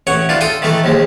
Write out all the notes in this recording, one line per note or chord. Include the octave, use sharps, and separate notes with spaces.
A1 C#5 F#5
E3 D4 F4
A4 G5 C6 D#6
D#3 E3 A3 A4
A#1 D#2 G#3